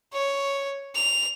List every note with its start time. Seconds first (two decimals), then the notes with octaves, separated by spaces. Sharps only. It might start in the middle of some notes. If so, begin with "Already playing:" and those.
0.13 C#5
0.95 F7